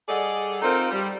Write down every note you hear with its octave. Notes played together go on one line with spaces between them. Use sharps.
G3 G#4 A4 D5 D#5 F#5
C4 D#4 F4 A4 A#4
G3